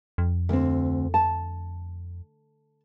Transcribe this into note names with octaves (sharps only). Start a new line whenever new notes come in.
F2
D2 C4
A5